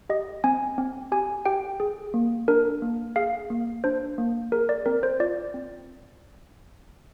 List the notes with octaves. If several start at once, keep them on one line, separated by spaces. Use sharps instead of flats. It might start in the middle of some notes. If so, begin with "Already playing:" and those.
G4 D#5
C4 G#5
C4
G4 G#5
G4 G5
G#4
A#3
D4 A#4
A#3
G#4 F5
A#3
D4 C5
A#3
G#4 A#4
D5
C4 A#4
C5
F4 D5
C4